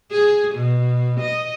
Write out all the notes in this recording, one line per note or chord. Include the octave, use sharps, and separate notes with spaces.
G#4
B2
D#5